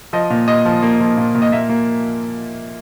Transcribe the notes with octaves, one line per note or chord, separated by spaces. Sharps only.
F3 D#5
A#2
A#2 D#5
F3
A#3
F3
A#2
A#2
D#5
A#3 E5
A#3